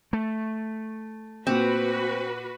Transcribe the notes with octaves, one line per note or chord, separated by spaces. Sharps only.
A3
A#2 C4 F#4 B4